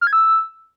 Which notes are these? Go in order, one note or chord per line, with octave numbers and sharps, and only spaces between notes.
F6
G#6
E6